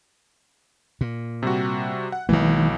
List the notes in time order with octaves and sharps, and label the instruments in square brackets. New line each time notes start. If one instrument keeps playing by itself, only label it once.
[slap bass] A#2
[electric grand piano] C3 G3 F#4
F#5
[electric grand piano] B1 E3 [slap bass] D#3 G#3 A#3